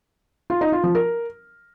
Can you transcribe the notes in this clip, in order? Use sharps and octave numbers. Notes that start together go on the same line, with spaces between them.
F4
D#4
F4
F3
A#4